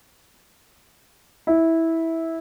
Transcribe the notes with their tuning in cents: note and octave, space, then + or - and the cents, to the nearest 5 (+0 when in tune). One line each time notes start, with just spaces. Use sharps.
E4 -15